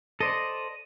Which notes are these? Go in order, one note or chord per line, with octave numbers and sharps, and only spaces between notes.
A4 C5 D5 D#5